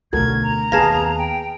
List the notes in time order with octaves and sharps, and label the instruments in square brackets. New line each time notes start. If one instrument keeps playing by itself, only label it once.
[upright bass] D2 B2 [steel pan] F#4 A4 A#4 [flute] G#6
[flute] A#5
[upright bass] D#2 B3 [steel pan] G#4 B4 F5 [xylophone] A5 G#6 A#6
[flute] G5